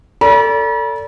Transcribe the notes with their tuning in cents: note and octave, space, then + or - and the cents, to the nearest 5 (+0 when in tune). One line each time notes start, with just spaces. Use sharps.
A4 +25 D5 -30 B5 -45